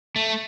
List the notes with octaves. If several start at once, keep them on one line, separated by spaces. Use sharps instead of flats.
A3